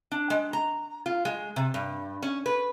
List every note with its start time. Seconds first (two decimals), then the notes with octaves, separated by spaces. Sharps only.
0.12 D4
0.30 G#3
0.53 A#5
1.06 F4
1.25 G#3
1.56 C3
1.74 G2
2.22 C#4
2.46 B4